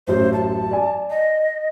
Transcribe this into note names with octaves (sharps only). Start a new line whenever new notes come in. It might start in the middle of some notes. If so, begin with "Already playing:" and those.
A1 F#2 C5
A5
D5 G#5
D#5